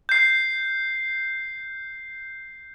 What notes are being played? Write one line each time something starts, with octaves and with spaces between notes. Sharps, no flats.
G6 C7